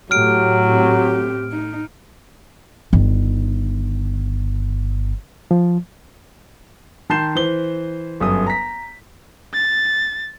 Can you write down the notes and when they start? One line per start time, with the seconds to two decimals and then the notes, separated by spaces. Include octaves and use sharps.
0.11 A2 F#3 G4 F6 D7
0.68 C4 G4
1.52 D#4
2.93 G1 D#3
5.51 F3
7.10 D#3 A5 C6 G6 C7 E7
7.35 E3 C5 G7
8.20 G1 F#2 D#6
8.47 A#5 B6
9.54 A6